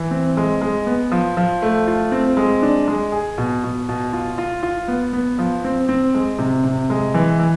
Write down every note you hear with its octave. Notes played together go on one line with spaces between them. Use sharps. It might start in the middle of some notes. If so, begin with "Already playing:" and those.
Already playing: E3
C4
G#3
G#3
B3
F3
F3
A3
F4
C4
G#3
D4
G#3
G#4
B2
B2
B2
F4
F4
F4
B3
B3
F3
C4
C4
G#3
C3
C3
G#3
E3
E3